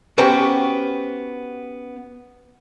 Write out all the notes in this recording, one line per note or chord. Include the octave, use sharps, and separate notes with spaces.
B3 C#4 F#4 G4 C5 G5